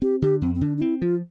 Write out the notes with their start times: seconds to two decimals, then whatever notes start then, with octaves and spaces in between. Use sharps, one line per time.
0.02 C4 G4
0.22 D3 G4
0.41 F2 C4
0.55 C4
0.61 D3 D4
0.78 D4
0.81 C4 E4
1.01 F3 F4